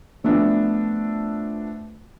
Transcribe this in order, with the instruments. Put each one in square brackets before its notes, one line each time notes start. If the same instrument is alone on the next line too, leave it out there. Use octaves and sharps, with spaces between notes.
[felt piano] F3 A3 B3 D4